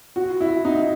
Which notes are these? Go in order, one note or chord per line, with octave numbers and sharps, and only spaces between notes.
F#4
E4
D#4